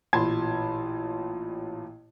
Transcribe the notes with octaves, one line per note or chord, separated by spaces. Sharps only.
A1 A#2 A5 B5 C6 G#6